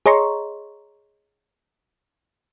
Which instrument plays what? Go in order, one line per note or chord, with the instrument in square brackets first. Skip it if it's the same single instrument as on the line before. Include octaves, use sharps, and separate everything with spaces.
[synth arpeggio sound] G#4 C#5 D#5 A#5 C6 C#6